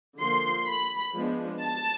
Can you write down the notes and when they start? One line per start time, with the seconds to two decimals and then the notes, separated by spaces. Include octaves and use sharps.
0.19 D3 F3 A#3 C6
0.68 B5
1.14 F3 G#3 B3 D4
1.62 A5